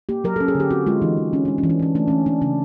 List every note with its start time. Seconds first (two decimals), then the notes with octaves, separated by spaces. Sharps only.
0.09 A#3 G4
0.24 F#3 A#4
0.36 C#4 A4
0.48 G#4
0.55 D3 G4
0.71 C4 F#4
0.87 G#3 F4
1.02 E3 D#4
1.17 E3
1.33 C4 C#4
1.45 G#3 D4
1.58 C#4
1.64 E3
1.70 D4
1.80 E3 C#4
1.95 A3 D4
2.08 E3 C#4
2.26 C4 D4
2.41 C#3 D4